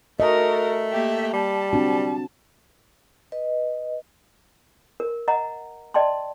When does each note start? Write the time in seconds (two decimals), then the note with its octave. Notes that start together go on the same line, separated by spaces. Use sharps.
0.20 A3 F#4 A4 A#4 D#5
0.91 A#3 G4 E5
1.34 G3 A5
1.73 C4 D4 F#4
3.32 B4 D#5
5.00 A#4
5.28 D#5 F#5 A#5
5.94 D5 D#5 G5 A5 C6